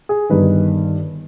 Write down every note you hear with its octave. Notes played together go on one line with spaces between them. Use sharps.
G#4
G1 G2 D#3 B4